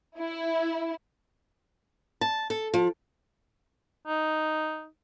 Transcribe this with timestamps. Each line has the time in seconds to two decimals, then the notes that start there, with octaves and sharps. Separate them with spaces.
0.18 E4
2.21 A5
2.50 A4
2.74 F3
4.08 D#4